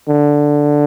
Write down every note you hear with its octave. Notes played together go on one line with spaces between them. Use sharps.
D3